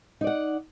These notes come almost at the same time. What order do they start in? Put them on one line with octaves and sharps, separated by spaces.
D#4 D5 F#5